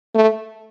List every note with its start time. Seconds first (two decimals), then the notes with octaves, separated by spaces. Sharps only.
0.15 A3